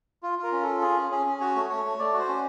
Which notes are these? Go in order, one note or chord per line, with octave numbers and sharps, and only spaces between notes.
F4
F4 A#4
C#4
F4 A4
G#4
C#4
C#4 G#4
C#4
F#4 C#5
A3
A3 C#5
A3
A3 D5
F#4
C5
C#4